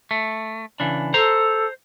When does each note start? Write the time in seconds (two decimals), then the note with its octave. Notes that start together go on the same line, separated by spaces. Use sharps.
0.11 A3
0.80 C#3 E3 D4
1.14 A4 C5 A#5